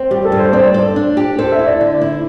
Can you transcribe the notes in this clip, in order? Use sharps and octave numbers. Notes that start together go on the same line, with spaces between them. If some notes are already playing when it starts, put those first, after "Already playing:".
Already playing: C4
G3 G4
A4
G2
C5
C4 D5
A4
D4
G4
A4 C5
E5
E4
D5
D3
E4